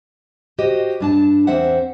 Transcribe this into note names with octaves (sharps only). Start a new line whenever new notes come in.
F#4 G4 C5 D#5
G2 D4 A5
E2 C4 C5 E5 F#5